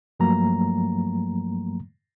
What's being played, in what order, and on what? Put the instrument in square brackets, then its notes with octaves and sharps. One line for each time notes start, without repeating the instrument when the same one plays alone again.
[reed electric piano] G2 F3 F#3 A3 A#3 A#5